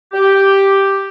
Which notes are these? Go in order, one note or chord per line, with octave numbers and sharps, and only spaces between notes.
G4